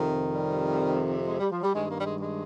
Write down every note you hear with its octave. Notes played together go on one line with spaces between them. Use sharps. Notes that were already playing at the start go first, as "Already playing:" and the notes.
Already playing: F2 C3 D#3
G3
G#3
G3
F3
G3
G2 D#3 G#3
A#3
G3
G#3
G#3